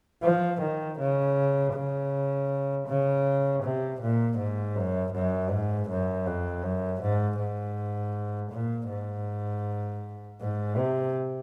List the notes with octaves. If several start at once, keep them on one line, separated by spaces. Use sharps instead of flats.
F3
D#3
C#3
C#3
C#3
C3
A#2
G#2
F#2
F#2
G#2
F#2
F2
F#2
G#2
G#2
A#2
G#2
G#2
C3